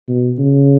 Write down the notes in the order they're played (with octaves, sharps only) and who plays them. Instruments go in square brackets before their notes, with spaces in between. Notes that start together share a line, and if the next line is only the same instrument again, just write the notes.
[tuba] B2
C#3